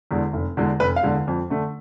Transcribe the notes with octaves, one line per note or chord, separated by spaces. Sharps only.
E2 D3 G#3
F1
E2 D3 G#3
F1 B4
F5
E2 D3 G#3
F2
D3 A3